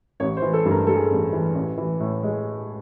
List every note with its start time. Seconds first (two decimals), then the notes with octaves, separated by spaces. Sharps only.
0.20 A1 C#5
0.37 C5
0.42 E3
0.53 A4
0.65 G2
0.71 A#4
0.87 G3 A4
0.97 G#4
1.05 A1 A4
1.33 E3
1.55 A1
1.78 E3
2.00 A2
2.23 G#3